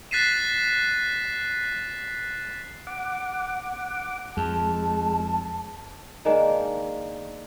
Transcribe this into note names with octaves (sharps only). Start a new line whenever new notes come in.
F#6 A6 B6 C7 D#7 E7
F#5 D6
F2 G#3 A5
D#3 G#3 A#3 D4